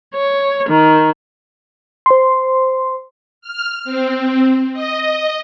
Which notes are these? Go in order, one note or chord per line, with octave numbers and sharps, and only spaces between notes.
C#5
D#3
C5 C6
F6
C4
D#5